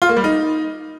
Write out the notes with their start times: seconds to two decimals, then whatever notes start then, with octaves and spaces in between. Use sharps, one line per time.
0.02 F4
0.09 A#3
0.17 G3
0.24 D#4